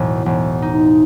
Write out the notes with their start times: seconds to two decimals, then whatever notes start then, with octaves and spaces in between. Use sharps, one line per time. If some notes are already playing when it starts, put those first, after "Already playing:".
Already playing: E1 A2
0.26 E1
0.62 D#4